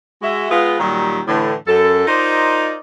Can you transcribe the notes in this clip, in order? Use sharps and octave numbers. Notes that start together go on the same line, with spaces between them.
G#3 F#4 E5
G#3 B3 F4
A#2 D#3 F#3 G3
A2 D3 E3
F#2 A4
D#4 F4 A#4 C5 D5 D#5